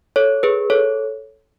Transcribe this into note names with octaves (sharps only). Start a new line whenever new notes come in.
A4 C#5
G#4 B4
A4 C#5